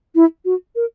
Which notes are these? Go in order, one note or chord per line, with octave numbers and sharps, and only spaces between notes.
E4
F#4
A#4